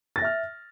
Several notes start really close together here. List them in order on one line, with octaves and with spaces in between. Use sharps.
A6 A#6 E5 F6